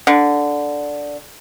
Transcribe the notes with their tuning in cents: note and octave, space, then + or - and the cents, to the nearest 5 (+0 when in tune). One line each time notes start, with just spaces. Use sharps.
D3 -5